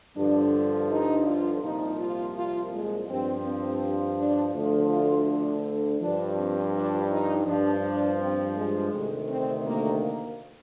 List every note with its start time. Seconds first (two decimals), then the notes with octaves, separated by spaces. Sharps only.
0.16 G2 D3 F3 D4
0.90 D#4
1.26 F4
1.62 C2 A#2 F3 D#4
1.99 F4
2.35 F4
2.72 G#3
3.08 G2 F3 C4
3.45 C4
4.18 D4
4.54 D2 D3 F3
4.91 F4
5.27 D4
6.00 G2 F3 D4
6.37 C4
6.73 D4
7.09 D#4
7.46 G2 F3 D4
7.82 D4
8.19 C4
8.55 G#3
8.92 D2 C3 D#3
9.28 C4
9.65 A#3
10.01 A#3